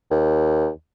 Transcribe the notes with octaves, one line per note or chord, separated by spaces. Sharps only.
D#2